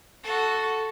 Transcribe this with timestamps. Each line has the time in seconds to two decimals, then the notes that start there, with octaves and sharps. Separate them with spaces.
0.24 F#4 A4